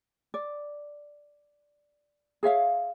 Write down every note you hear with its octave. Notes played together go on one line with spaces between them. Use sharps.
D5
G#4 C#5 E5 F5